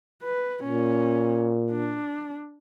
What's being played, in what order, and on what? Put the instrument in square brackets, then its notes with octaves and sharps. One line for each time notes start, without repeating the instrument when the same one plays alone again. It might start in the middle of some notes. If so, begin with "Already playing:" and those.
[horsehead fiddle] B4
[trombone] A#2 [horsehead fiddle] C#4
[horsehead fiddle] D4